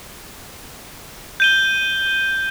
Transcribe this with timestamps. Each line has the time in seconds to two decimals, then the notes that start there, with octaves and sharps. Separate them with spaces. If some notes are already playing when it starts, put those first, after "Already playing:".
1.40 G6 D#7 G7